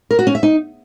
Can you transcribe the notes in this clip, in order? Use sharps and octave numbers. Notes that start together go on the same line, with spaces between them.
A#4
F#4
C#4
E5
D#4